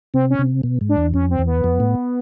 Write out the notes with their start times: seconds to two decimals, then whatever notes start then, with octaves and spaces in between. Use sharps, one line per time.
0.14 C3 C4
0.30 C#4
0.39 C3
0.63 B2
0.81 G#2
0.89 D4
0.98 E2
1.14 F2 C#4
1.30 C4
1.39 E2
1.47 B3
1.64 F2
1.80 A2